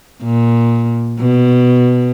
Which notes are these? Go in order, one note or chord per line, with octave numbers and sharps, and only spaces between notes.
A#2
B2